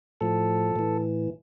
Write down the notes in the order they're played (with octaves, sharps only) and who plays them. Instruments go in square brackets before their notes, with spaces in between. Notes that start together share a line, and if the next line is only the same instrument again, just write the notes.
[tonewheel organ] A2 F3 A4
A2 E3